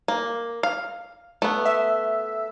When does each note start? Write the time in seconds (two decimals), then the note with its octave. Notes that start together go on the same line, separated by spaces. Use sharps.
0.08 A#3
0.63 F5
1.42 A3 B3
1.65 E5